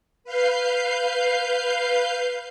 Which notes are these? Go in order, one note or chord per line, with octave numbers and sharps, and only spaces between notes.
B4 F5 G6 C7